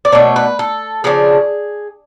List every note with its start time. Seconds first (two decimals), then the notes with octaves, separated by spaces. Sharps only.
0.05 D5
0.12 B2 A3 D4 C#5
0.36 B4
0.59 A4
1.04 C#3 F3 A3 D4 G#4